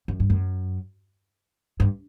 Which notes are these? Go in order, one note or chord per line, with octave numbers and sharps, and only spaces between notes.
F#2
G2
F#2
G2